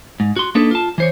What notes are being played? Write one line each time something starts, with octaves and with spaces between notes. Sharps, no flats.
G#2
F#4 C6
A#3 D4 D#4 A4 B4
F4 A5
E3 C5 C#5